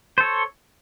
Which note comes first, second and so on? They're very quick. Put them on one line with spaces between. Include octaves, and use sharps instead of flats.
C5 A4 C#5